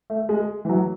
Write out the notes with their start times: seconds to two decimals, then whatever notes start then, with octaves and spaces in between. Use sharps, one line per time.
0.10 A3
0.29 G#3
0.65 E3
0.69 F#3